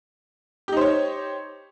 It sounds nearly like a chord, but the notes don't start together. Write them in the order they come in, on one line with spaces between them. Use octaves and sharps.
G4 D#4 C5 C#5